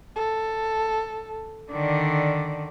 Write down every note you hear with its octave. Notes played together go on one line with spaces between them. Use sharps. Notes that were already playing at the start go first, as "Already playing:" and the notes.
A4
D3 D#3 D5